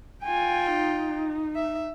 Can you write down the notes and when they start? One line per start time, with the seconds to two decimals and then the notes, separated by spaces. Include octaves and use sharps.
0.24 F4 G5 G#5
0.71 D#4
1.56 E5